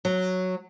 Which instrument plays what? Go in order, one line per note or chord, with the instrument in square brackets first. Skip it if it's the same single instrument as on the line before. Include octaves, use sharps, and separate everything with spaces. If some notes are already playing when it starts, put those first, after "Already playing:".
[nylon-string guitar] F#3